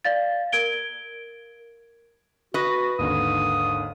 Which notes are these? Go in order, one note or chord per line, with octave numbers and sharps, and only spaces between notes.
D5 F5 A6
A#4 G#6 D7 G7
F#4 B4 D#5
G#1 D#2 D3 D#6